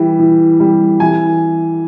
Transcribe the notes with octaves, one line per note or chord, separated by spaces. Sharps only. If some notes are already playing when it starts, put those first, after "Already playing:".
Already playing: E3 G3
E3
G3
E3 G#5